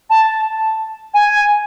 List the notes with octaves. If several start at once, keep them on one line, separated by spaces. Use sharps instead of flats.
A5
G#5